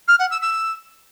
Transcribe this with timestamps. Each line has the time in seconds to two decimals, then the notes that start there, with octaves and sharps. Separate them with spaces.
0.08 F6
0.19 F#5
0.30 E6
0.41 E6